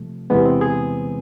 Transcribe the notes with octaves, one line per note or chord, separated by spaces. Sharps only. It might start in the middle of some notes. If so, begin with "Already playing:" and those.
Already playing: C3 F3 A3
E2 C3 E3 G#3 B3
C4
G#4